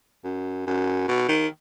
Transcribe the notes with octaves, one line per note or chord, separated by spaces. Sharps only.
F#2
F#2
B2
D#3